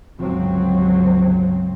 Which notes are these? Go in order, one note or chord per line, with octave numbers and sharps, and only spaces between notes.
G1 C#2 F3 F#3 C4